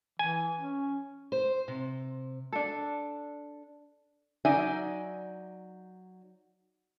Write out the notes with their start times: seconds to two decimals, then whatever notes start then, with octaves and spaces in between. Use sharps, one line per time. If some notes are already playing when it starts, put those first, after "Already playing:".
0.19 E3 G#5
0.59 C#4
1.32 C5
1.68 C3
2.52 D4 A4
4.45 F#3 D#4 D5 E5 G#5